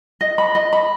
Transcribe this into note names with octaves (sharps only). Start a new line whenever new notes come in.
D#5
B5
D#5
B5